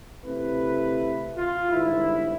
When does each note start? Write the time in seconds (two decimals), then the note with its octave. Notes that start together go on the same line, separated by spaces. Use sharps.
0.24 C3 A3 E4 B4
1.37 F4
1.71 G1 E2 G#2 E4